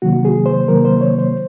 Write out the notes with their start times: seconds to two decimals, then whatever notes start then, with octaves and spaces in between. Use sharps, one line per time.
0.02 C3 D#3 F#3 A#3 F#4
0.25 G#4
0.46 C5
0.68 C3 D#3 F#3 A#3 A#4
0.85 C5
1.01 C#5
1.19 C5